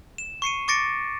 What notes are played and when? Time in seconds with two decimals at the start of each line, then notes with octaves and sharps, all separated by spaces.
0.18 E7
0.42 C#6 C7 C#7 D#7
0.68 C#6 D6 A6 A#6 C#7 D7